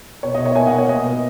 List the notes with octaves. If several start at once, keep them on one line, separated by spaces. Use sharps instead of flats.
B2 C#5
D#5
B2
C#5 E5
A#3 E5 G#5
D#5 F#5
A#3
C#5
B2 D#5
B3